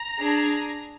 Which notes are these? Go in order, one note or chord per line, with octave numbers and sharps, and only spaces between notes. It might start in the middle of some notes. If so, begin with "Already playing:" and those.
Already playing: A#5
D4 G#4